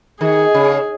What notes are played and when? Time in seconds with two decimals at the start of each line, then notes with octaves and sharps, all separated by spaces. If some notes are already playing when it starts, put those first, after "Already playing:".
0.21 D#3 G#4
0.54 C#3